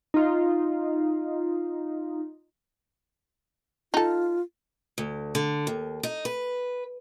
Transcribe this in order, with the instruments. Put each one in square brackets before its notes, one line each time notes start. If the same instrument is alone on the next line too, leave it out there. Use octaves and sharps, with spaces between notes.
[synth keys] D#4 F4
[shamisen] D#4 A4 [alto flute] F4
[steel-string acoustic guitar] D2
D3
D#2
D#4
B4